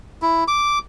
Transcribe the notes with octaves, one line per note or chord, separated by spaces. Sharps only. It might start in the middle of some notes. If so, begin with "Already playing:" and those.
E4
D6